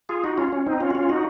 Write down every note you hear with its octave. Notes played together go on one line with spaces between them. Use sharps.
F4 G#4
D#4 F#4
C#4 F4
C#4
C4 D#4
C#4 F4
F#4
C#4 F4
D#4 F#4